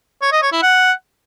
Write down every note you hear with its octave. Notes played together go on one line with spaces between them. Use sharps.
C#5
D#5
C#5
E4
F#5